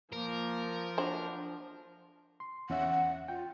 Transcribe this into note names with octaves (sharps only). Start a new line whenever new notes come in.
F3 A#3 A#4
F#3 D4 C5
C6
E2 C#4 E5 F#5
F4 G5